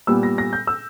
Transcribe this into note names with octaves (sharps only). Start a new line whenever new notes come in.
A#2 G3 B3 E6
A#6
A#6
G6
E6